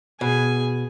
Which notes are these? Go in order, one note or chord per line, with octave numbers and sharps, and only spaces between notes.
B2 G#4 G#5